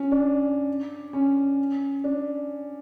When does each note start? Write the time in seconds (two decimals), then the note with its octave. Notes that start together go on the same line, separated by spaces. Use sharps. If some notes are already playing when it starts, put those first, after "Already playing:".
Already playing: C#4
0.12 D4
1.13 C#4
2.04 D4